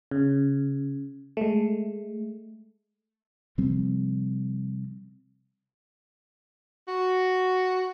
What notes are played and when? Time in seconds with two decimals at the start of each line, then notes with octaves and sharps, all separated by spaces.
0.11 C#3
1.37 G#3 A3
3.58 C3 F3 G3 C4
6.88 F#4